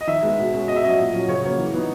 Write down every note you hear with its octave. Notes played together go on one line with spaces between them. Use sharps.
D#5
D#3 E5
G#3 B3
B2
G#3 C#4
B2 D#5
E5
F#3 C#4 D#5
A#2
F#3 C#4
C#3 C#5
F#3 A#3 C#4 C#5
E3
B3 D#4